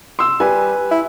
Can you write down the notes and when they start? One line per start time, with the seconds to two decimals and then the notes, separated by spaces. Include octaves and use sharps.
0.19 C6 E6
0.40 G3 B4 G#5
0.91 E4